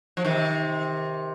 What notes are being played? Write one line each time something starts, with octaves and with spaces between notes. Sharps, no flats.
F3
C3 D#3